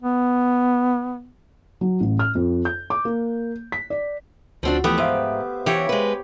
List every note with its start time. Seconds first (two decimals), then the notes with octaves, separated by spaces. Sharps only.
0.03 B3
1.81 F#3
2.00 A1
2.19 F6
2.35 F2
2.65 G6
2.90 D6
3.05 A#3
3.72 B6
3.90 D5
4.63 D2 F3 C4 D4 F#4
4.84 E3 F3 A3 B3 G4
4.98 G#2 C5 E5 F5
5.66 E3 G4 C#5
5.89 G#3 B4